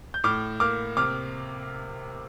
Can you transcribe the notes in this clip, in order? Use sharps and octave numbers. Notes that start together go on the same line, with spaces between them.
G6
A2 D6 F6
A#3 D6 F6
C3 D6 F6